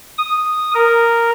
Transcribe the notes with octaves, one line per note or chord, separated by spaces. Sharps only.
D#6
A#4